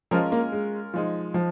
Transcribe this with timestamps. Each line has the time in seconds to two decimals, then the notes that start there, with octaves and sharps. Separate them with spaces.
0.11 F3 G#3 C#4 F4 A#4
0.32 A#3
0.52 G#3
0.94 F3 G#3 D#4
1.34 F3